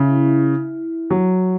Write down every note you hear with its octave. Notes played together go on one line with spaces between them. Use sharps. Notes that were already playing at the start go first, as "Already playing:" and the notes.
Already playing: C#3 E4
F#3